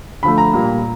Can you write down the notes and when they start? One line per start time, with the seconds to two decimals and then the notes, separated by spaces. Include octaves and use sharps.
0.23 D3 F3 A3 B5
0.38 A#5
0.53 A#2 G3 A#3